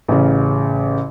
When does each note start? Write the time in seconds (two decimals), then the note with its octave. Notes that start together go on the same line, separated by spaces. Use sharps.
0.08 A1 C#3